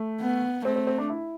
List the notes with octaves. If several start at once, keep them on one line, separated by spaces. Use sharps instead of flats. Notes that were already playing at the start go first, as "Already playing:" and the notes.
Already playing: A3
B3
A3 C4
C4
C4
D4
E4